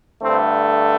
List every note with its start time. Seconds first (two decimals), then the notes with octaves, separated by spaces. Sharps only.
0.23 G2 D3 A3 C4